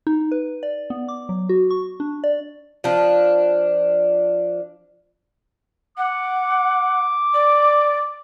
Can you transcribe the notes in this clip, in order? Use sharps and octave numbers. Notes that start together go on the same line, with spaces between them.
D#4
B4
D5
B3
D6
F#3
F#4
C#6
D4
D5
F3 D4
F#5 D6
D5